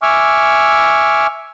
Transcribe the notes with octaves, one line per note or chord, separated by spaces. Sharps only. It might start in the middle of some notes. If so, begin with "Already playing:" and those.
E5 G#5 C#6 D6 E6 F6